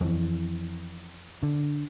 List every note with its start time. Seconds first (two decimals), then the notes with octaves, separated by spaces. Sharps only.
0.01 F2 E3
1.43 D3